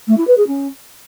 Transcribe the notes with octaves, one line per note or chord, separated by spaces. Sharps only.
A3
E4
B4
G#4
C#4